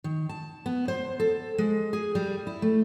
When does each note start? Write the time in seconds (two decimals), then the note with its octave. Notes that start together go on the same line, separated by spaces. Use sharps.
0.04 D#3
0.29 A5
0.66 B3
0.88 C5
1.20 A4
1.58 G#3
1.93 G#4
2.15 G3
2.47 E4
2.62 A3